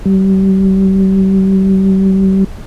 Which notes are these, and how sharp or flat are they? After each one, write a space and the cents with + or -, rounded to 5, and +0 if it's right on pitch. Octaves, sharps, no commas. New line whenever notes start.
G3 -35